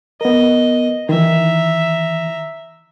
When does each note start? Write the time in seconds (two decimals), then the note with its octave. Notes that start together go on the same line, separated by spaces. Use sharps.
0.21 B3 A#4 D#5
1.09 D#3 E3 E5 A#5